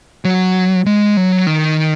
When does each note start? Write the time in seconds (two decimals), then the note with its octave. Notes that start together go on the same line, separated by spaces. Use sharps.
0.25 F#3
0.86 G#3
1.17 F#3
1.46 D#3